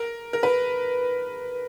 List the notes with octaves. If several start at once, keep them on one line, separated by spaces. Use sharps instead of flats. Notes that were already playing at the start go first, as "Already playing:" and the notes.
Already playing: A#4
A#4
B4